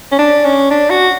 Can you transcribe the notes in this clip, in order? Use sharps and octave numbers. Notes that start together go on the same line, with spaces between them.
C#4
D4
C#4
D4
F#4